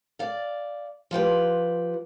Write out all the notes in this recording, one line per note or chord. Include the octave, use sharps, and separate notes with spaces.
D5 F5
F3 F4 G4 B4